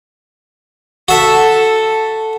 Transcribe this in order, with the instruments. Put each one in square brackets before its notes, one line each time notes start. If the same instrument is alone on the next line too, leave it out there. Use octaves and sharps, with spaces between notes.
[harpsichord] F#4 E5 [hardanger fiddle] A4